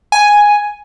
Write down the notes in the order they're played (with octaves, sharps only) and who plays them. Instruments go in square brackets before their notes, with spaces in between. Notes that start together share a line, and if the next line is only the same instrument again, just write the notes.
[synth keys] G#5